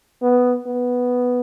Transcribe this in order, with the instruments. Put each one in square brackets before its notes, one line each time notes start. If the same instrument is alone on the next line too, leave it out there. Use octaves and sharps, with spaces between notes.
[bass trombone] B3
B3